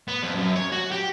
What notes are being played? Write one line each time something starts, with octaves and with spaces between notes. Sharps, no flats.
B3
F2
F#2
C#5
F#4
G4